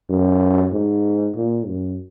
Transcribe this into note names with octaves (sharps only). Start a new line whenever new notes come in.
F#2
G#2
A#2
F#2